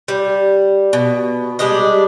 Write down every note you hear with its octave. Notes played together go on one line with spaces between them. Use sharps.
G3
B2
G3 G#3 D4 D#5